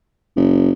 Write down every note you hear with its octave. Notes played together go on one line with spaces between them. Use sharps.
F#1